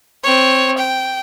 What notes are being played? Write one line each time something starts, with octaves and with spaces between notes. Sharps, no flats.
C4 C#5
G5